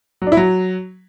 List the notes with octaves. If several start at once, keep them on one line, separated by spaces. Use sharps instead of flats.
F#3
D4
E4
F#3